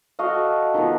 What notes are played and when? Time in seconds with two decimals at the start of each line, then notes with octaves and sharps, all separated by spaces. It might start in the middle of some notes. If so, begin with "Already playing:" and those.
0.19 F#4 A4 D#5 F5
0.74 D#3 F3 B3